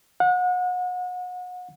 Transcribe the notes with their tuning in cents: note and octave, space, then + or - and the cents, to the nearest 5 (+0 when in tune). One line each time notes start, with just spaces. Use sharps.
F#5 -35